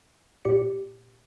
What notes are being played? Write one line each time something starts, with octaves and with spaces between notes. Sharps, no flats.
A#2 G4 D5 C#7